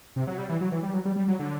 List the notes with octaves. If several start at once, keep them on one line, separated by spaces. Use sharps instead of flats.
C3
F#3
G3
E3
F#3
E3
G3
F#3
G3
G3
F#3
D3